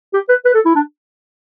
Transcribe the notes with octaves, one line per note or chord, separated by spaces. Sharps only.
G4
B4
B4
A4
E4
D4